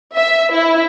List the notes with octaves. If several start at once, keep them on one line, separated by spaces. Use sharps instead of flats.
E5
E4